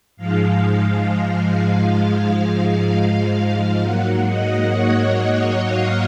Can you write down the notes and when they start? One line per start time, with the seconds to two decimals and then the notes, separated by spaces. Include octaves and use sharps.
0.17 G#2 F3 G#3 F5
3.81 G#2 F#3 A#3 F#5
4.27 D#5
4.72 C#5
5.03 C#5
5.33 C#5
5.63 F5